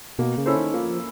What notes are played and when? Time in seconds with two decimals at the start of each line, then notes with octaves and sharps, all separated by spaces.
0.19 B2 A#3
0.38 C#3
0.46 C#4 E4 A4 C5
0.56 D#3
0.74 F3 A#3